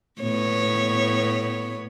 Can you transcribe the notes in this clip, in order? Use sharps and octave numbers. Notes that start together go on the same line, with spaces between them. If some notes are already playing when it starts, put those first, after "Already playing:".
A2 B3 C#5